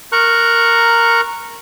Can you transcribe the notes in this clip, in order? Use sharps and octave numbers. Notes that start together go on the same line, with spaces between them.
A#4 A#5 C#6 F#6